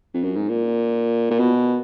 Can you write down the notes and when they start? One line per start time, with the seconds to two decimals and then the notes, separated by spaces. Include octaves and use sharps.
0.14 F2
0.23 F#2
0.36 G#2
0.49 A#2
1.31 A#2
1.39 B2